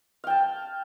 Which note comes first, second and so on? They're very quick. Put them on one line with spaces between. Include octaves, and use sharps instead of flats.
F5 G5 A5